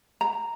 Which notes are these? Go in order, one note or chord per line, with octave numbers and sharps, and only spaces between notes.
A#5